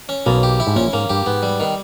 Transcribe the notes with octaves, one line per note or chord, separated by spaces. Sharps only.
C#4
B1 B2 A#3
G4
E4
G#2
A#1 A#2 C#4
G#2 A#3
G2 G4
G#2 B3
G3
D#3